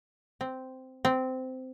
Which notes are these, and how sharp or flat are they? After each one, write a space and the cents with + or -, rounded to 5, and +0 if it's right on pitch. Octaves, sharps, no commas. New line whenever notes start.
C4 -10
C4 -15